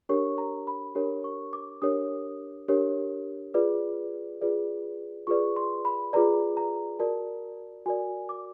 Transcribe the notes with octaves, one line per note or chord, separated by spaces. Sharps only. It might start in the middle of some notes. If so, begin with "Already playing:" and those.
D4 G4 A#4 C#5 C#6
A#5
B5
D4 G4 A#4 C#5
C#6
D6
D4 G4 A#4 C#5 D#6
D4 G4 A#4 C#5
F4 G#4 B4 D5
F4 G#4 B4 D5
F4 G#4 B4 D5 C#6
C6
B5
F4 G#4 B4 D5 A#5
A#5
F#4 A#4 D5 A5
F#4 A#4 D5 G#5
D6